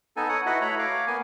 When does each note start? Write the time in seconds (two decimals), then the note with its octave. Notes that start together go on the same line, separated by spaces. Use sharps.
0.17 B3 D#4 A4 G#5
0.29 C#5 F#5 D#6
0.46 E4 F#4 B4 D#5 F#5
0.61 A3 C#5 A#5 B5
0.79 C#5 F5 D6
1.07 A#3 B3 G#5